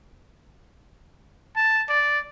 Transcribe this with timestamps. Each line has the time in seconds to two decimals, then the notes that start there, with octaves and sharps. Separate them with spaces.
1.56 A5
1.89 D5